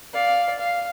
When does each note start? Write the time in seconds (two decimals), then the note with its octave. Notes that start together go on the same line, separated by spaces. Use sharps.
0.13 D5 F5
0.58 F5